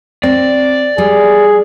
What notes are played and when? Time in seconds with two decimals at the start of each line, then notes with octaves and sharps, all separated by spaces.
0.23 C4 D5
0.98 G3 G#4